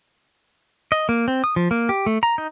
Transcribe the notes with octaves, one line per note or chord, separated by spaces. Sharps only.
D#5
A#3
C4
D#6
F3
A#3
G4
A3
A#5
D#4